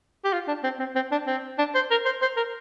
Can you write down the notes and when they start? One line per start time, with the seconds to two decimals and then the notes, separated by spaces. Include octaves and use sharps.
0.25 G4
0.33 F4
0.48 D4
0.64 C4
0.80 C4
0.96 C4
1.12 D4
1.27 C4
1.58 D4
1.75 C5
1.91 A#4
2.05 C5
2.22 C5
2.37 A#4